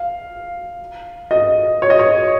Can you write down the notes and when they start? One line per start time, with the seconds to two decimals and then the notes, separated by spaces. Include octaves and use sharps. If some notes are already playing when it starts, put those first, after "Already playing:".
Already playing: F5
1.31 D#5
1.82 C#5
1.90 D#5
1.99 C#5